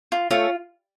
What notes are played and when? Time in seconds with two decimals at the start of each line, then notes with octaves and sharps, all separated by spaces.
0.12 F4
0.31 A3 C#4 F4